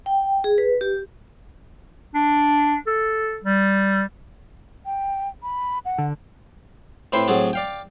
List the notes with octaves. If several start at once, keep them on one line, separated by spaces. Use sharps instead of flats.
G5
G#4
B4
G4
D4
A4
G3
G5
B5
F#5
D3
A2 C4 E4 B4 G5 C6
A2 F#3 C4 F#4 G#4 A4
D5 F5 G5